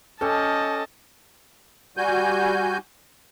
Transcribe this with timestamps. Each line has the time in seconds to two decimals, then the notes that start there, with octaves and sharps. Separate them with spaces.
0.21 C#4 G4 A4 D#5 A5
1.97 G3 F#4 G#5 G6